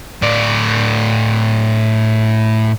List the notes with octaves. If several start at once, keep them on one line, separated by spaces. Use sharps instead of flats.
A2 D5